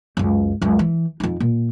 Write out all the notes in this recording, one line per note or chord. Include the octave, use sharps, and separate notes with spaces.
C#2 F#2
C#2 F#2
E3
F2 D#4
A#2